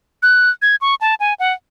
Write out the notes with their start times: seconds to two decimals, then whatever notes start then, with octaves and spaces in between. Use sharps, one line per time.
0.23 F#6
0.62 G#6
0.81 C#6
1.01 A5
1.20 G#5
1.40 F#5